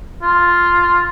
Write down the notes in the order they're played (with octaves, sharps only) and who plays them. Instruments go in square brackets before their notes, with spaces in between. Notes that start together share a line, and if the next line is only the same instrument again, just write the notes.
[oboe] F4